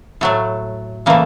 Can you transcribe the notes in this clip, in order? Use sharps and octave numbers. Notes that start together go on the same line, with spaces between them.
A2 F#3 A3
C#3 E3 A3 A#3